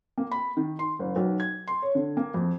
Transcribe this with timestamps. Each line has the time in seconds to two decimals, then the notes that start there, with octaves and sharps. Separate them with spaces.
0.18 A#3
0.31 B5
0.57 D#3
0.79 C6
0.99 F#1
1.16 B1
1.40 G#6
1.68 C6
1.82 C#5
1.95 D3
2.17 A#3
2.34 F2